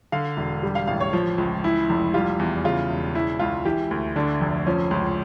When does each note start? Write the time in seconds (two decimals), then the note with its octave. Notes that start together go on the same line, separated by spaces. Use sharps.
0.12 D3 F5
0.37 E1
0.63 G3
0.75 F5
0.87 A1 F5
1.00 C#5
1.13 F3
1.38 C#2
1.64 E3 E4
1.89 F1
2.14 G3 F4
2.39 E2
2.64 C#3 F4
2.90 E1
3.15 E3 E4
3.39 C#2 F4
3.65 E3 G4
3.91 D2
4.16 D3 D4
4.41 F1
4.67 F3 C#4
4.91 C#2